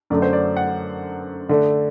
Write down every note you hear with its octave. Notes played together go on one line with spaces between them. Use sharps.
F#2 D3 F#3 A3 D5
C5
D5
F#5
D3 A3 D4